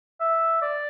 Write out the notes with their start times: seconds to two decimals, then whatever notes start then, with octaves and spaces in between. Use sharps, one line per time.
0.21 E5
0.62 D5